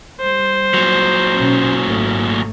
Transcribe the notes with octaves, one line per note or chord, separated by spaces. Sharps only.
G3 C5
A#2 F#3
B2 C#4
G#1 A3